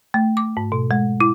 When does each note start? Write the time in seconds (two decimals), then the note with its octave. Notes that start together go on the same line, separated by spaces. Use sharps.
0.14 A3
0.37 D6
0.57 G#2
0.72 B2
0.91 G#3
1.21 E4